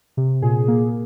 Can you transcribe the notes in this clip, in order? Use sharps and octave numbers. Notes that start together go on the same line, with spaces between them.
C3
A#2 G#4
A#3